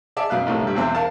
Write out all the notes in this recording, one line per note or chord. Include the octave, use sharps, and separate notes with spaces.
G#4 D5 E5 A5
F#2 B2 F5 F#6
A#1 A2 C3
G2 G3
B1 E2 C4
A#4 F5 A5